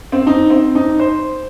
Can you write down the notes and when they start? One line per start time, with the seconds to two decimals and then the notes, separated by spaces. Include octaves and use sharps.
0.12 C4
0.27 D#4
0.50 C4
0.75 D#4
0.99 C5